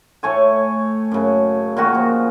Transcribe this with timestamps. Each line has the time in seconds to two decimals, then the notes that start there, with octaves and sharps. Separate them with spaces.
0.23 A2 A3 C#5 G#5
1.12 F#2 C#3
1.77 A#2 D#3 F#4
1.95 F3